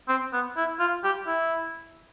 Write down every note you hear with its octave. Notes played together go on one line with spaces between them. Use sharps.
C4
B3
E4
F4
G4
E4